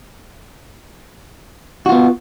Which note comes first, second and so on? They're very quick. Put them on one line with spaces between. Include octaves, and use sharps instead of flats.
F#4 F4 B3